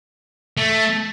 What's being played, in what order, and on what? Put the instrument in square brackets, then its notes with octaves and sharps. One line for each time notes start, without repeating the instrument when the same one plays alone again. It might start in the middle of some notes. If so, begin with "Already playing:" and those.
[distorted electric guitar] A3